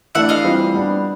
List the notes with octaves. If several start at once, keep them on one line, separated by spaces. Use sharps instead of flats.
E3 A3 D4 E5 F#5
D#5 F5
E3 G3 C4 F4
G3 B3 D4